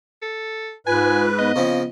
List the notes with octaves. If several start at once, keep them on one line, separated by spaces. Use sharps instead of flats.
A4
G#2 F4 B4 G#5
B3 D#5
C#3 F3 C4